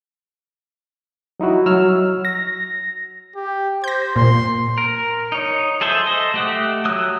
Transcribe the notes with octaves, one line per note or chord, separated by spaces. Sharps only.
F#3 D#4 E4 F#4
F#3 E6 F6
A#6
G4
C5 G6 A#6
A#2 C6
A#4
D#4 C#5
G#4 A4 C5 E5
A4 C5 D#5
A3 G4 F#5
F#3 D#6 E6 F#6